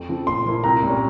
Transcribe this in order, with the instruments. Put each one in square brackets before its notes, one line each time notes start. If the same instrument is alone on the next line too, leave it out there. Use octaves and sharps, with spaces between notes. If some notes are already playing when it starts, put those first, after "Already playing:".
Already playing: [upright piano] F2
C#3 F3 C4
[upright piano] A#2 [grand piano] C6
[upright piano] F3 A#3 E4
[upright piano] C2 [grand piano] A#5
[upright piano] A#2 G3 C#4